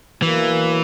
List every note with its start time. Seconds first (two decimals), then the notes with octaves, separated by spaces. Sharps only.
0.22 B2 E3 F#3 A#3